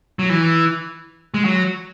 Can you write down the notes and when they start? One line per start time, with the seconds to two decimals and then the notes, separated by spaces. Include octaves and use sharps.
0.19 F#3
0.30 E3
1.34 G#3
1.45 F#3